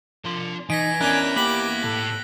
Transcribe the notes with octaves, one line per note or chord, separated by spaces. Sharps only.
F3 D4 C6
E3 D#4 G#5 A#6 B6 D7
B3 C#4 D4 E4 A#4 F#6 G#6 G7
A#3 G4 B5 F#6 B6 F#7
A2 A4